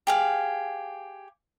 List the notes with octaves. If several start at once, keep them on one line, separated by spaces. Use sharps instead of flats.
G4 G#4 F5